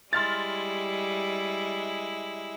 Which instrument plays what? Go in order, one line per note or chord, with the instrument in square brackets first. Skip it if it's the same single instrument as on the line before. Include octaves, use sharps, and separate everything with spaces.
[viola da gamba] G3 [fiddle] G#3 E4 [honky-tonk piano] C6 F6 A6